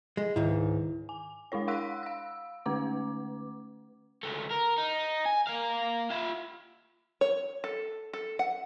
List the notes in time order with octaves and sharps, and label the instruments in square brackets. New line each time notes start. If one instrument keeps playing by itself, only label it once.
[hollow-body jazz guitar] G#3
[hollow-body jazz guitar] C#2 G#2 [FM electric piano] D#3 E4
[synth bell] G#5
G#3 D4 E4 C#5
F5 F#5 C6 E6 F#6 B6
F5 E6
D3 A3 C#4 B4 D6
[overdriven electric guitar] C#2 A3
A#4
D#4
G#5
A#3 F5
F4 E5
[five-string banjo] C#5
A4
A4
F#5